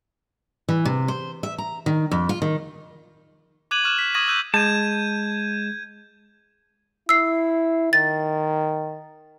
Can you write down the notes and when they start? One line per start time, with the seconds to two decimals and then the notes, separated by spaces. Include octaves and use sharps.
0.69 E3
0.85 C3
1.08 C5
1.43 E5
1.58 A#5
1.86 D#3
2.11 F2
2.29 F4
2.42 D#3
3.71 D6 F#6 G#6 D#7 F#7
3.84 C#6 D6 F6 F#6 G#6 E7
3.99 B6
4.14 C#6 D#6 G#6 A#6 D#7 F#7
4.28 E6 F#6 G6 D#7 F#7
4.54 G#3 A5 G6 G#6 D#7
7.09 E4 E6 C7
7.93 D#3 A6